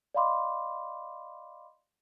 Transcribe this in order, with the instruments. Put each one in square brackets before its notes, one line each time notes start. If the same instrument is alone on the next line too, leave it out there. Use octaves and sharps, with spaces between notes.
[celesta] D5 D#5 F5 B5 C6 D6